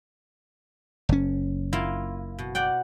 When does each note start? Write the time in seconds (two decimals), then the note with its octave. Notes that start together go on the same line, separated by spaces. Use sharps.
1.09 F#1 C#4
1.73 A#3 E4 F4
2.39 B2
2.55 D5 F#5 G5